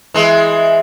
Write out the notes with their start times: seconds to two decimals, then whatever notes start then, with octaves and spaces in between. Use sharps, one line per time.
0.14 E3 G#3